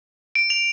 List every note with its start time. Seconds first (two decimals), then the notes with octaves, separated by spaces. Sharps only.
0.35 D7
0.50 F7